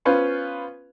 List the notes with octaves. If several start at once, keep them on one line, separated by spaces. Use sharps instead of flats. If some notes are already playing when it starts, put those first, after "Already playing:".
B3 C#4 F4 B4 C5